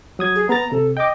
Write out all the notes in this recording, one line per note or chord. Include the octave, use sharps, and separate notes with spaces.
F#3 D#6 G#6
G#4
B3 A#5 A6
C3 A4
D#5 G5 D6